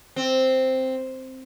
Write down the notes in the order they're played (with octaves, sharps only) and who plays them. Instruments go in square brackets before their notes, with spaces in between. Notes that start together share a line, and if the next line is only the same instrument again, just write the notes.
[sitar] C4